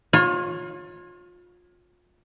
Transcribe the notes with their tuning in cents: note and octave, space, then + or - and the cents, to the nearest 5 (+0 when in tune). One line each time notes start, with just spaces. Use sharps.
F4 +30 C#5 -10